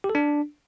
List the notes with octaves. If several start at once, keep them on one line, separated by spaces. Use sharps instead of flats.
G4
A4
D4